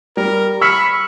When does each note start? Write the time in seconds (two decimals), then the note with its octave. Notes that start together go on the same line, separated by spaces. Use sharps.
0.17 G3 A#4
0.61 B5 C#6 E6 F6 B6